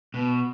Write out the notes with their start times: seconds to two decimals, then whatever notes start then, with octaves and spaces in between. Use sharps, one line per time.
0.14 B2